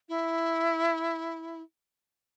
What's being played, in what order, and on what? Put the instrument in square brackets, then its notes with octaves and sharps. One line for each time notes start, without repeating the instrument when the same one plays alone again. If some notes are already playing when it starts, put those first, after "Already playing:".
[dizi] E4